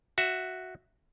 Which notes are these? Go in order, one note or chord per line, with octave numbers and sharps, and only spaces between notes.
F#4 E5